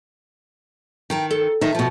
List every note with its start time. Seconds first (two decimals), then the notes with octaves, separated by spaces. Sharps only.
1.10 D#3 G5 A5 A#5
1.31 A4
1.61 D#3 D#4 E5 A5
1.75 B2 F3